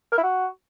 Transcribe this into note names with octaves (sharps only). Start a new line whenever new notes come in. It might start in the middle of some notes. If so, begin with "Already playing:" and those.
A#4
E4
F#4